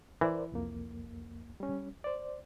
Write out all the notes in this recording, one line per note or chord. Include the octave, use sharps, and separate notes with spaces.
E3 A#4 C5 D5
C2 F2 A#3
G3 C#4
C5 D5